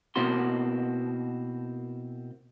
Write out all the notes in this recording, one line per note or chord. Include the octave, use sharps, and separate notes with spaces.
B2 A#3 C4 E4 F#4 C6